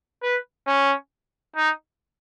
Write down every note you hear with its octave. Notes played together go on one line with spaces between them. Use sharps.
B4
C#4
D#4